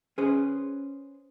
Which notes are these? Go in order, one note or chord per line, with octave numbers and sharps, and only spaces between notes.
C#4 G#4 B4 C5